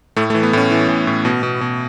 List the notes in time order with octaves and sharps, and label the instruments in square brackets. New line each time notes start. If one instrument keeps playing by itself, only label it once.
[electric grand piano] A2 A3
A3
E3
B3
A2 C#4
E3
A2
A2
B2
B2
B2